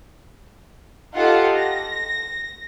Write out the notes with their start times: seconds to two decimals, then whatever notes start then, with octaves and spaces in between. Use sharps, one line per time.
1.15 D#4 F4 G4 A4 F5 F#5
1.57 A#6